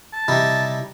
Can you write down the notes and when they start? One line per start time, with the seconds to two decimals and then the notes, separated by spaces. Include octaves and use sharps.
0.13 A5
0.28 C3 G3 D#4 E4